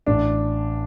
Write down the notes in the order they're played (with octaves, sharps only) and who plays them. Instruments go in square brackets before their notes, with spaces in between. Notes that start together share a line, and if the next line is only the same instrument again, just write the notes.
[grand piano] A1 D4